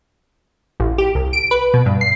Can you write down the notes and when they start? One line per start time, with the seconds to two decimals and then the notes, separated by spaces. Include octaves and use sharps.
0.80 A1
0.98 G4
1.15 C2
1.33 D7
1.51 B4
1.74 B2
1.86 G2
2.01 C7